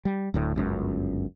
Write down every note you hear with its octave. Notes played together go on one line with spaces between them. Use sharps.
G3
D1 D2 A2
G1 C#2 F#2